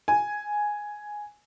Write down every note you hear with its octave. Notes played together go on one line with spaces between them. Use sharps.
G#5